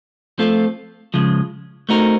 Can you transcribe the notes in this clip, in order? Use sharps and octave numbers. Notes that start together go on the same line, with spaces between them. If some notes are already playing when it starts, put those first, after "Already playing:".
F3 A3 C4 F4 A4
C#3 F3 G#3
A3 C4 D#4 F#4 A#4